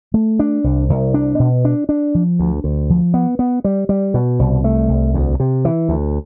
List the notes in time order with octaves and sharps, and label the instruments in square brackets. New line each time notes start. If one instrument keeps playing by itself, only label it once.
[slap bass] A3
D4
C2
C2
D4
B2
D4
D4
F3
D2
D2
F3
B3
B3
G3
G3
B2
C2
A3
C2
D2
C3
E3
D2